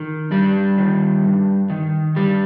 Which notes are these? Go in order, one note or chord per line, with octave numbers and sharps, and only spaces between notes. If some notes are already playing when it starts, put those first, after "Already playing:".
Already playing: D#3
G2 G3
D#3
G2
D#3
G2 G3